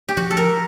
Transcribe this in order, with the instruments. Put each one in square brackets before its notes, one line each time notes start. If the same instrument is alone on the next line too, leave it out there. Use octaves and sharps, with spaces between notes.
[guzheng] G4
[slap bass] F3 [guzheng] F#4
[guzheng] A4
A#4